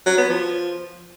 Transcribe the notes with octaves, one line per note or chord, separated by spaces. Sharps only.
F#3
B3
F3